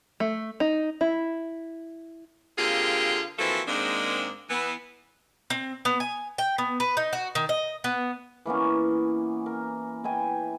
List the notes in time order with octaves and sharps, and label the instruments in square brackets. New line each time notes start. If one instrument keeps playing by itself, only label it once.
[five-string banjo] A3
D#4
E4
[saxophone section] D3 A#3 C4 F4 G4 G#4
E3 F3 A#3 C4 F#4 A4
G#2 D#3 G#3 A#3 C4 D4
E3 B3
[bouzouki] C4
B3
G#5
G5
B3
B4
D#4
F#4
D#3
D#5
B3
[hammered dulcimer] E3 A#3 B3 C#4
A#4
B3 E4 G5 G#5